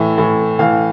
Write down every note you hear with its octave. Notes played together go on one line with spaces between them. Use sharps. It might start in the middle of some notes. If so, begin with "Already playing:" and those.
Already playing: A2 E3 E5
A2 E3
A2 E3 F5